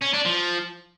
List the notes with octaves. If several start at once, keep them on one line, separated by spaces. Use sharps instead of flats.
C#4
D4
F3